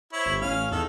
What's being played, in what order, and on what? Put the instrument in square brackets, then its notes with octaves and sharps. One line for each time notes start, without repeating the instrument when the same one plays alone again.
[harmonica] E4 C5 C#5
[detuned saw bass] G1
[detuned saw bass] A1 [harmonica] C#4 F5
[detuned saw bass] E2 [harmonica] D#3 A4